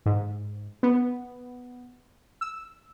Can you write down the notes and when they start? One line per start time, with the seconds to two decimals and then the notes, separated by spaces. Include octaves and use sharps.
0.06 G#2
0.83 B3
2.41 E6